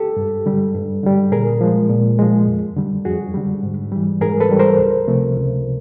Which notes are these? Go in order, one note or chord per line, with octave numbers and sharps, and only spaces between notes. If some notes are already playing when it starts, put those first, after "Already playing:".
Already playing: G4 A4
G2
D3 G3
G2
D3 G3
A#2 G#4 A#4
F3 G#3
A#2
F3 G#3
F2
D3 G3
F2 F#4 G#4
D3 G3
G#2
E3 G3
G#2 G#4 A#4
A4 B4
E3 G3
A#4 C5
C#2
C3 F3 A3
C#2